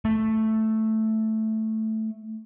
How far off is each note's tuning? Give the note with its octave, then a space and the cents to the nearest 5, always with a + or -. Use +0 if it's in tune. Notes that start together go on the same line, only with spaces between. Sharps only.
A3 +0